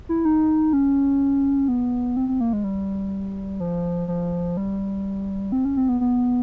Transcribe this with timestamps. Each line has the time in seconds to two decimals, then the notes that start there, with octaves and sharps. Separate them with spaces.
0.09 E4
0.25 D#4
0.73 C#4
1.68 B3
2.17 C4
2.28 C4
2.41 A#3
2.53 G#3
2.64 G3
3.60 F3
4.08 F3
4.57 G3
5.52 C4
5.65 C#4
5.77 C4
5.89 B3
6.01 B3